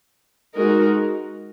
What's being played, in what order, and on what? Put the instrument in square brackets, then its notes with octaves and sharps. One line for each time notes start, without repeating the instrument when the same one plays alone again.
[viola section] G#3 D#4 F#4 A#4